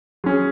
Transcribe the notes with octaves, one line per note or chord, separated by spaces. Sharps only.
F#3 C#4 G#4